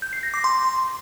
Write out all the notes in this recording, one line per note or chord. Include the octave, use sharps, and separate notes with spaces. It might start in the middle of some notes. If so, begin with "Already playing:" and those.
G6
C7
A#6
D6
C6